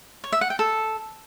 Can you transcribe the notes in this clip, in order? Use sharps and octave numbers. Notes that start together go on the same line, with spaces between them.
C#5
E5
F#5
G5
A4